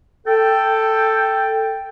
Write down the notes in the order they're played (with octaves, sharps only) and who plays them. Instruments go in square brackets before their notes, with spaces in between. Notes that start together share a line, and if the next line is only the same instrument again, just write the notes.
[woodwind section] A4 G5